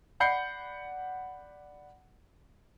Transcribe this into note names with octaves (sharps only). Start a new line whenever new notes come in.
D5 F#5 B5 G6 C7 C#7